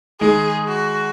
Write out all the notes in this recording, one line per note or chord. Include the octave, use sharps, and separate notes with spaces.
D#3 G#3 G#4
F#4